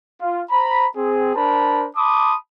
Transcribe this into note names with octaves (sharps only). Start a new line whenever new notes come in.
F4
C5 A#5 B5
C4 G#4
D4 A#4 C5 A5 B5
A5 B5 C6 D6 D#6